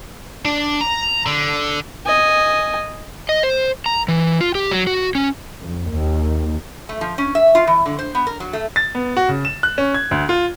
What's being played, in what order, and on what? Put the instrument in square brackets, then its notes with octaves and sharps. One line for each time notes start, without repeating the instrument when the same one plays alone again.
[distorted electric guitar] D4
A#5
D3
[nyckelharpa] D#5 G#5
[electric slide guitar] D#5
C5
A#5
E3
F4
G4
F#3
F#4
C#4
[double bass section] F2
D#2
[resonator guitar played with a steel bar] A3
F3
C#4
E5
F4
E3
D3
C5
B3
A#4
F#3
A3
[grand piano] A6
B3
F#4
C#3
E7
F#6
C#4
G#6
D2
F4